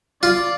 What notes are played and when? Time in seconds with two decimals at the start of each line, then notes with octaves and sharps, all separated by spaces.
0.23 F4 D5